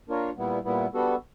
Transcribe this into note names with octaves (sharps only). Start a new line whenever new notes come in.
A#3 D4 F4 A#4 C#5
A#2 G3 B3 E4
A#2 G3 B3 E4
G3 B3 D4 F#4 A4